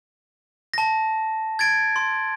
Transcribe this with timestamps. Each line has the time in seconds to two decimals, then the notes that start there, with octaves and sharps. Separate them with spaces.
0.74 A5 A#6
1.59 G#6 A6 D7
1.96 C6